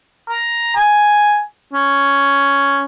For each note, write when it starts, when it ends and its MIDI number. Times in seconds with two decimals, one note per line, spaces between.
0.30 0.72 82
0.76 1.41 80
1.74 2.85 61